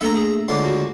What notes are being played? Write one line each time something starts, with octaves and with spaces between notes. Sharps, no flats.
A3 A#3 D4 A4 E5 A#5
G#4
C#2 D3 C6 D6
F#4